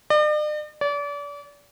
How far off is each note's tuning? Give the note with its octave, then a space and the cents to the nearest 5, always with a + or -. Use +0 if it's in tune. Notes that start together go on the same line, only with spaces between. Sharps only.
D5 +45
D5 -35